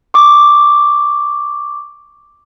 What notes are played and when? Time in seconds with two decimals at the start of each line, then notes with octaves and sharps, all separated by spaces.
0.14 C#6 D6